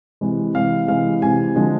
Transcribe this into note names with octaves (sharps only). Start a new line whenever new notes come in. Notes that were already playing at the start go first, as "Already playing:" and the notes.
C3 E3 G#3
C3 E3 G#3 F5
C3 E3 G#3 F5
C3 E3 G#3 G#5
D3 F3 G#3 C4